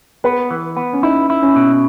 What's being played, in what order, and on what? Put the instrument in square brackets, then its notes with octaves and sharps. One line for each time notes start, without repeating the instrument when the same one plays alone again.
[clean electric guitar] B3 [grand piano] B4
[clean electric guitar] E3
B3
[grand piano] C#4
[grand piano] D#4 [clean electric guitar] E4
[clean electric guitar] E4
[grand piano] C#4
[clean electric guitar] B2